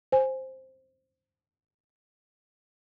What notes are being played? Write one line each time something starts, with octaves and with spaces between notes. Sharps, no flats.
C5 G#5